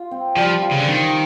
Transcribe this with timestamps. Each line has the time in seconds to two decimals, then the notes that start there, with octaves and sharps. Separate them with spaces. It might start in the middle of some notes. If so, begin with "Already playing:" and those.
Already playing: F4
0.11 C4
0.36 F3 G3
0.62 F4
0.72 C#3
0.80 D3
0.88 D#3 C4